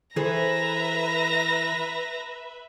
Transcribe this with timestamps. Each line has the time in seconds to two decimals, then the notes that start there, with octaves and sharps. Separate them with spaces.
0.16 E3 G#4 A4 B4 C5 E5 A#5 A#6